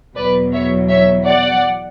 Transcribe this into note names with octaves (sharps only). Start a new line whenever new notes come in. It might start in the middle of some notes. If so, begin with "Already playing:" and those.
E2 B2 F#3 B4 D5
C#5 E5
C#5 E5
D5 F#5